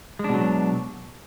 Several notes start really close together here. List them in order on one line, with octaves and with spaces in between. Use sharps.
G#3 D4 B2 F#3